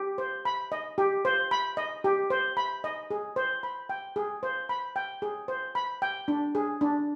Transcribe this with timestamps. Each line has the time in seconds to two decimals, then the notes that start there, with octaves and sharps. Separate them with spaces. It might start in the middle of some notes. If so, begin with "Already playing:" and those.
Already playing: G4
0.18 C5
0.45 B5
0.72 D#5
0.98 G4
1.25 C5
1.51 B5
1.77 D#5
2.04 G4
2.30 C5
2.57 B5
2.84 D#5
3.11 G#4
3.36 C5
3.63 B5
3.89 G5
4.16 G#4
4.43 C5
4.69 B5
4.96 G5
5.22 G#4
5.48 C5
5.75 B5
6.02 G5
6.28 D4
6.55 G#4
6.81 D4